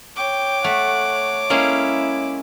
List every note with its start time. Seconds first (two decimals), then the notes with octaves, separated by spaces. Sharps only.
0.16 C#5 G5 D6
0.64 A3 F#5
1.50 G#3 A#3 C#4 E4